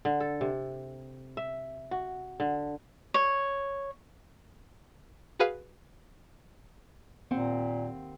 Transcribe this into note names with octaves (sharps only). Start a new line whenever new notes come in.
D3
A4
C3
E5
F#4
D3
C#5
F#4 G#4 B4 F5
D#2 A#2 C4 F#5